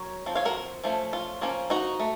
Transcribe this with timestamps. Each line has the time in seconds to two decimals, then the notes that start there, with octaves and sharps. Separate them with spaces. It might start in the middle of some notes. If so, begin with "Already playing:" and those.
Already playing: F#3 A#4 C#5
0.26 F3 C4
0.35 C#5 F5
0.45 F#4 A#4
0.84 F3 A3 C#4
1.13 F4
1.41 F3 A#3 C#4
1.70 D#4 F#4
2.00 A3